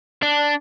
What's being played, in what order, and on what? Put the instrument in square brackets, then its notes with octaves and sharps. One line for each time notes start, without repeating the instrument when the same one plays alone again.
[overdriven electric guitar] D4